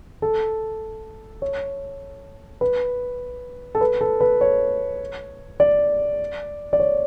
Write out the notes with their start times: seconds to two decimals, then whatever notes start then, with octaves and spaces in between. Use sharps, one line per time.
0.22 A4
1.42 C#5
2.61 B4
3.75 A4
3.81 B4
4.01 A4
4.21 B4
4.41 C#5
5.60 D5
6.73 D5
6.80 C#5